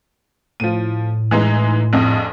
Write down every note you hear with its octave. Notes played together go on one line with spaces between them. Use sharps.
A2 F3 D#7
E3 G#3 D#4
A#1 F2 D#5